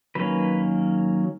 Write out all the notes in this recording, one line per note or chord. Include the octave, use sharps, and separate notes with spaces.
D#3 F#3 A#3 C#4 B4